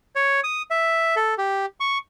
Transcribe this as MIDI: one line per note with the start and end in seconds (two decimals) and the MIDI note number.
0.15 0.40 73
0.44 0.62 87
0.71 1.15 76
1.16 1.34 69
1.38 1.66 67
1.80 1.98 85